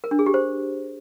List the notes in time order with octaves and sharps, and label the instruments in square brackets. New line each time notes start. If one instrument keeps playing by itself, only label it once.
[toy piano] A#4
D4
G#4
G4
C5